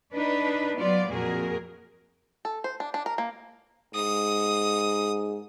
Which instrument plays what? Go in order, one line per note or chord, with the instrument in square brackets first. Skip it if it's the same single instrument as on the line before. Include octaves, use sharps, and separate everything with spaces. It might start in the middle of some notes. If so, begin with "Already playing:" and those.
[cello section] D4 D#4 B4
F#3 B3 F4 D5
F2 A#2 F#4 G#4 A#4
[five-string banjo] A4
C5
D4
D4
A#4
A#3
[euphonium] G#2 [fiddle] D#6